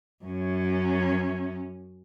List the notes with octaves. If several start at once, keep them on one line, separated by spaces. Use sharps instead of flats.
F#2 C#4